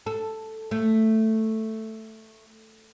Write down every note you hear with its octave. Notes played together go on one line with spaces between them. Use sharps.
A4
A3